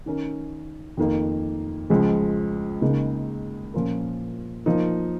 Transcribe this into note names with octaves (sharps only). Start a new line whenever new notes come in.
D#3 C#4 A#4
F2 D#3 A#3
C#2 C#3 F3 G#3
C#2 C#3 A#3 D#4
A#2 F3 C#4 F4 A#4
F3 A#3 D#4